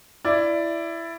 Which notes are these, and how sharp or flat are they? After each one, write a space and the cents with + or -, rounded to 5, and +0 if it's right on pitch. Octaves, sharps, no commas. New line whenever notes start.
E4 +15 D5 +0